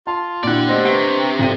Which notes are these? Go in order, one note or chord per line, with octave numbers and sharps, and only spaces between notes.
F4 A5
A#2 A#3 D4 E4 F#4 D5 F#5 G5
A3 B3 C4 G4 D#5 A#6
C3 D4 B4 C#6 D7
G#1 F3 A4 D#7